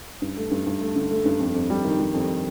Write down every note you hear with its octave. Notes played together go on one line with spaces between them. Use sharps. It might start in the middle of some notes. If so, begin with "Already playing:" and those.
G2
A3
G2
G2
A3
D3
A3
G2
F2
F2
G3
D#3
G3
F2